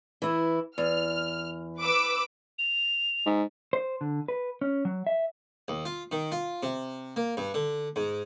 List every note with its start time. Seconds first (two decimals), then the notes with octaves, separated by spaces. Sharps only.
0.22 E3 E4
0.78 E2 F6
1.80 B4 D6 E6
2.59 F7
3.26 G#2
3.73 C5
4.01 D3
4.28 B4
4.61 C#4
4.85 F#3
5.07 E5
5.68 D#2
5.85 F4
6.12 D#3
6.32 F4
6.63 C3
7.16 A#3
7.37 G2
7.54 D3
7.96 G#2